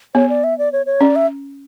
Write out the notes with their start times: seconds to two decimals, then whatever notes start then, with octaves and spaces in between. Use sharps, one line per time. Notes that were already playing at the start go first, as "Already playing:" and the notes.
0.15 B3 C#5
0.29 D5
0.44 E5
0.58 D5
0.72 C#5
0.86 C#5
1.01 C#4 D5
1.16 E5